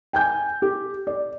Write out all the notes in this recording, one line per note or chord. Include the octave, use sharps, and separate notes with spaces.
G5 G#5 G6
G4
D5